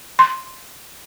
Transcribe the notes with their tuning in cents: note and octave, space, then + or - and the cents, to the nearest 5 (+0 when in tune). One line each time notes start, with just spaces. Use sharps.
C6 +0